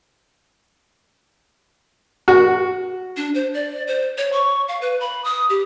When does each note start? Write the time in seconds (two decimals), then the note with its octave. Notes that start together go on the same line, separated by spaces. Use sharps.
2.28 F#4
3.17 D4
3.35 C5
3.54 D5
3.88 C5
4.18 C#5
4.33 C#6
4.68 F5
4.82 B4
5.00 B5
5.24 D#6
5.50 G4